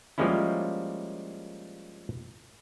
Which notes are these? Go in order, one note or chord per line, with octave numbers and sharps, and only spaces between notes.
F3 G3 G#3 A#3 C#4 E4